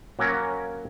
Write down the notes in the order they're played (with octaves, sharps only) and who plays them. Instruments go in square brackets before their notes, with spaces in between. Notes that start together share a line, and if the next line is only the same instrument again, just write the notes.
[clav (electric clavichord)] F#3 A#3 C#4 A#4 C#5